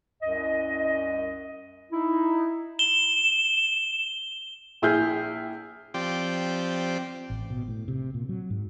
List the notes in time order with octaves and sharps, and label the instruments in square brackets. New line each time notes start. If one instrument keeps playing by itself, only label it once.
[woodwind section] C2 F#2 D#5
D#4 E4
[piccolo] E7 [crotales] G7
[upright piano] A#1 E4 G#4 F6 G6
[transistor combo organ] F3 C4 G4 D5
[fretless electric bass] A1
B2
A2
C3
A#2
F#3
G#2